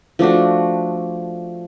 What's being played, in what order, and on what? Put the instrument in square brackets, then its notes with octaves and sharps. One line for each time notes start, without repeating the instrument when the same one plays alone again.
[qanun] F3 A3 D4 F#4